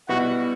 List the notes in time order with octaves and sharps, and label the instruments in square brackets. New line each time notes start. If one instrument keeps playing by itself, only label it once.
[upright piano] B2 G3 B3 E4 G4 [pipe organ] F#4